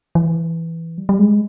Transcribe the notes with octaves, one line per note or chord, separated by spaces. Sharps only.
E3
G3
G3
G#3